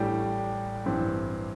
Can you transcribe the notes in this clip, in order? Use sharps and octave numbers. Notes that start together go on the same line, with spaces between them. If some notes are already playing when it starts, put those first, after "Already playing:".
Already playing: A1 A2 G3 D4 G4
A1 G2 E3 C4 E4